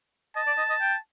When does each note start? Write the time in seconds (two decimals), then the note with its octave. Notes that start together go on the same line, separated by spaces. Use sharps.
0.36 D#5 A5
0.47 D5
0.58 D#5
0.70 D#5
0.81 G5